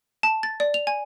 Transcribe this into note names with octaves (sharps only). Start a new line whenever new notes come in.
A5
A6
D5
F7
G#5